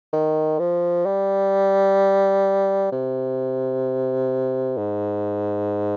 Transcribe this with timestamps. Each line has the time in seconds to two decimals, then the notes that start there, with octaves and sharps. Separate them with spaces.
0.13 D#3
0.59 F3
1.06 G3
2.92 C3
4.77 G#2